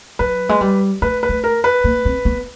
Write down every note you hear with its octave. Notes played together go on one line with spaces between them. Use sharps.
F#3 B4
G#3
G3
A3 B4
B4
A3
A#4
B4
A#3
C4
B3